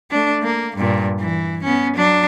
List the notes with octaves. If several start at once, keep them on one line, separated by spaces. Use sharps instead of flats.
A3 D4
A#3
G2 A#2
E3
B3 C#4
F#3 D4